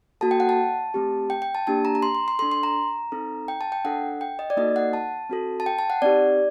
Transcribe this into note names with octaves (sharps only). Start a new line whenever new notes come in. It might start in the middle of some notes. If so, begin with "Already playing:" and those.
A#3 F#4 A4 A5
G5
F#5
A5
A3 C4 G4
G5
G5
A5
A#3 D4 G4 A5
A#5
A#5
C6
C6
C6
D4 A4 C6
C6
A#5
C4 D#4 A4
G5
A5
G5
D4 A4 F#5
G5
D#5
D5
A#3 D#4 F#4 A4 D#5
F#5
A5
C4 F#4 A4
A5
G5
A5
F#5
C4 D#4 G4 D5